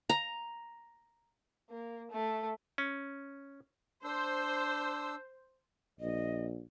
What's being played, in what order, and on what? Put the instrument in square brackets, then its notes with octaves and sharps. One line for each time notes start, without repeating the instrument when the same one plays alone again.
[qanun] A#5
[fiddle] A#3
A3
[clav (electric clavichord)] C#4
[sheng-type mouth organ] D4 E6 [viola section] C5
[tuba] A#1 [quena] D#5